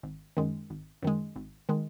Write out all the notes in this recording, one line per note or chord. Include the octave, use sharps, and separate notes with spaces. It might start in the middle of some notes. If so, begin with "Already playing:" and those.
G#1
F#2 D#3 G#3
G#1
F#2 D#3 G#3
G#1
D#3 G#3